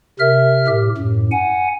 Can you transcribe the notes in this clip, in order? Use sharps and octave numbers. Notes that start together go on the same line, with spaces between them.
C3 A#4 E5 F6
A2 G4
F#2 A2
F#5 G#5